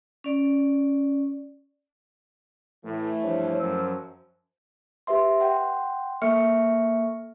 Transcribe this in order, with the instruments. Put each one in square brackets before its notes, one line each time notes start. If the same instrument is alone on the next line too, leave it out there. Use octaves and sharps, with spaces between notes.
[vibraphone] C#4 D5
[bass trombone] A2 [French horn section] E3 A3
[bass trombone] G2 [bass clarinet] F3 [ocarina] C#5
[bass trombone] F#2 [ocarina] E6
[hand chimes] G4 B4 E5 C6
F#5 G5 C6
A#3 A4 E5 C#6 F6 C#7